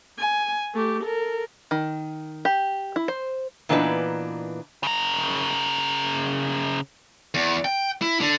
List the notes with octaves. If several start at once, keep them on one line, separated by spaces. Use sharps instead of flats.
G#5
A3 G4
A4 A#4
D#3
G4
E4
C5
A#2 E3 B3 D4 D#4 B4
C#3 A#4
E2
G5
E4
D3